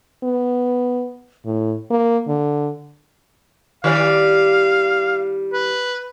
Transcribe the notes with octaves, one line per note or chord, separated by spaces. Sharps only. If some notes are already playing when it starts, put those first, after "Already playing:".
B3
A2
A#3
D3
D#3 G3 D5 F5
B4